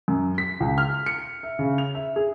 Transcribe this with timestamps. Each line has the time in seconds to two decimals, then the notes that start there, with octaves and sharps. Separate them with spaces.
0.08 F#2
0.38 B6
0.60 C#2
0.78 F6
1.06 C#7
1.43 E5
1.59 C#3
1.78 F7
1.95 E5
2.16 G#4